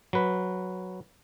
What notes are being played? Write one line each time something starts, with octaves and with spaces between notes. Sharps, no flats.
F#3 B4